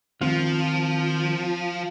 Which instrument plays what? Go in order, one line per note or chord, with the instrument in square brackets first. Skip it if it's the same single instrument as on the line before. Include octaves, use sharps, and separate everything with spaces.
[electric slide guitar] D#3 C4 F4 [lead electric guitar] F3